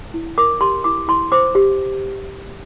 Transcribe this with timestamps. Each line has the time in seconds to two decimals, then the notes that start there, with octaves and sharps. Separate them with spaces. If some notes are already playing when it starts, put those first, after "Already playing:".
0.14 E4
0.38 A#4 D6
0.61 G4 C6
0.84 E4 D6
1.08 E4 C6
1.32 C5 D6
1.55 G4